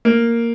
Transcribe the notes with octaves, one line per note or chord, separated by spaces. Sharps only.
A#3